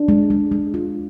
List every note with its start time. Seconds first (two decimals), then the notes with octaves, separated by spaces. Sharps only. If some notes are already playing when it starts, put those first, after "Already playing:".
Already playing: D4
0.08 G#3
0.30 G#3
0.52 G#3
0.74 F4